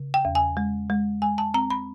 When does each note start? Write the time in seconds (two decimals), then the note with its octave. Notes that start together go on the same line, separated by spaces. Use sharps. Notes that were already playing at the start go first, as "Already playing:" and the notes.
Already playing: C#3
0.14 G5
0.25 E2
0.35 G#5
0.57 G#3
0.90 G#3
1.22 G#3 G#5
1.38 A5
1.54 C4 A#5
1.70 B5